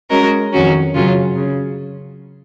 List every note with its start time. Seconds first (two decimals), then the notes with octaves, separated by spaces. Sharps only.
0.10 G#3 C#4 F#4 A#4 D#5
0.52 F2 D#3 F#3 C#4 F#4
0.94 F#2 C#3 F#3 C#4 F4
1.36 C#3